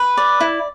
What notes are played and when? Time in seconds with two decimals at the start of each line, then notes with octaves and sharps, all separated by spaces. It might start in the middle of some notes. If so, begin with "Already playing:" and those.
Already playing: B4
0.17 D5
0.40 E4